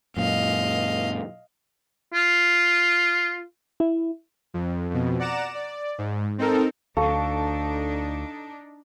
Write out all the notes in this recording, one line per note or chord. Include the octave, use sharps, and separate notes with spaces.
F#2 A#2 D#5 F5
F4
E4
F2
F2 B2
D5 F#5 A#5 D6 E7
D5
G#2
C4 D#4 A4 A#4
D2 D4 D#4 A4 F5 C#6